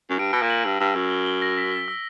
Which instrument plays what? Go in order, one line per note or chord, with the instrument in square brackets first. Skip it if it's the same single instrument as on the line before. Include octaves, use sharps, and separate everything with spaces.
[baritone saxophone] F#2
[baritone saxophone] G2 [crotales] D7
[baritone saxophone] B2 [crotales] A#6
[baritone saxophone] A#2
[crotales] F#7
[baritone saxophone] G2 [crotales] E6
[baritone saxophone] G2 [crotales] E6
[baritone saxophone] F#2 [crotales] E6
[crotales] G7
G7
A#6
B6
B6
E6